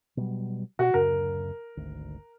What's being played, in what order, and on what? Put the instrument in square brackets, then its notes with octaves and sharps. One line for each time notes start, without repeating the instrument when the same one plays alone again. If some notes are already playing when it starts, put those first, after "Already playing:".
[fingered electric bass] B2 F#3 G3
[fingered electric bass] B2 [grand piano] F#4
[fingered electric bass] D1 F#2 C#3 [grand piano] A#4
[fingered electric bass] G#1 D2